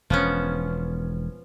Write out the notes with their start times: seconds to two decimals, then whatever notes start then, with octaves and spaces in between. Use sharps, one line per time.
0.10 E1 F3 B3 C#4